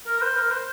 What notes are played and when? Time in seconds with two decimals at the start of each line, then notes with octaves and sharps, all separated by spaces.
0.07 A#4
0.18 A#4
0.22 C5
0.36 A#4
0.51 C5